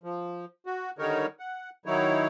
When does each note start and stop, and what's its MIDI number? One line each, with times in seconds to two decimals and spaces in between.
0.03 0.45 53
0.66 0.91 66
0.99 1.26 50
0.99 1.26 51
0.99 1.26 55
0.99 1.26 63
0.99 1.26 70
0.99 1.26 73
1.40 1.70 78
1.86 2.27 51
1.86 2.27 54
1.86 2.27 63
1.86 2.27 64
1.86 2.27 73